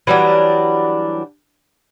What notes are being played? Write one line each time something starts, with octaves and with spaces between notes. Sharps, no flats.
E3 F#3 G3 D4